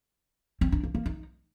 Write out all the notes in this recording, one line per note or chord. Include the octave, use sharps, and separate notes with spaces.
C4
D4
A#3
A#3
D#4